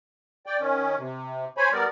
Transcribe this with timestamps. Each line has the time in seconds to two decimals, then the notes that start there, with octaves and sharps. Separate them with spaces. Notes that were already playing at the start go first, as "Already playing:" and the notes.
0.46 D5 G5
0.61 D#3 C#4
0.99 C3
1.57 C5 C#5 G#5 B5
1.72 G3 B3 A#4 D5